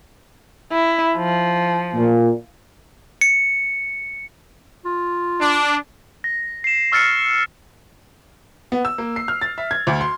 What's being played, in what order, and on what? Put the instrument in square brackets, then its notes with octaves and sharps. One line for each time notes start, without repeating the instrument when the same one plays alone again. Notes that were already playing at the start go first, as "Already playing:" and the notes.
[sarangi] E4
F3
[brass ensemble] A#2
[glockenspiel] C#7
[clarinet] F4
[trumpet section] D4
[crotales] A#6
C7 E7
C#6 E6 F6 A6 C7 C#7
[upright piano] B3
E6
A#3
C7
F6
A6
E5
G#6
D2
C6